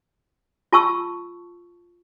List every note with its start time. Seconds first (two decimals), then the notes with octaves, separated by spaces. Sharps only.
0.73 F4 A5 C#6 E6